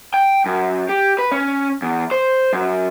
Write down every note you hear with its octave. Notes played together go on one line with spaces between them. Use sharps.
G5
F#2
G4
B4
C#4
E2
C5
F#2